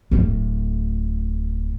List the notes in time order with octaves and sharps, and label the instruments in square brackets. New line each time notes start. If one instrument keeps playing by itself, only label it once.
[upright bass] D1 A2